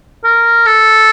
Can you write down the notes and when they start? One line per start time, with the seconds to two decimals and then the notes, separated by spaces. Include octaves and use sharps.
0.24 A#4
0.66 A4